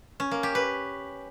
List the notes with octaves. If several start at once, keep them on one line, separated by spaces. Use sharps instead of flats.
C#4
A#3
G4
B4